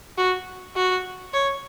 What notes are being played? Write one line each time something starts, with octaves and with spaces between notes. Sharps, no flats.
F#4
F#4
C#5